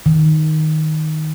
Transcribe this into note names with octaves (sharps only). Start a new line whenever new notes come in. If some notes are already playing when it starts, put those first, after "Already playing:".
D#3